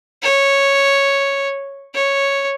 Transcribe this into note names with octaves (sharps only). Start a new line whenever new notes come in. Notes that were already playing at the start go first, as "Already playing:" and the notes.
C#5
C#5